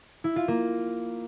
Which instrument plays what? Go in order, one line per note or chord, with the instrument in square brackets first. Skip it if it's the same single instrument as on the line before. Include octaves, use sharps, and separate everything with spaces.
[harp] E4
F4
A#3